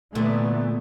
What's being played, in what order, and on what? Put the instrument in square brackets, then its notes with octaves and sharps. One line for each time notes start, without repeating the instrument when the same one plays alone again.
[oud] A#2 D3 [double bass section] E3 A3 B3